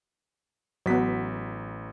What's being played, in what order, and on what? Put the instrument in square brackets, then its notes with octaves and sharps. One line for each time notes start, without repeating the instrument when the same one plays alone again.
[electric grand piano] A1 B6 [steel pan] F#3 B3